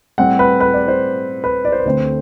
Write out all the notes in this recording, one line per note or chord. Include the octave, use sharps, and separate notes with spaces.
A2 G3 C4 F#5
B4
B4
D5
C5
B4
D5
C5
B4
D2 D3 A3 C4 C5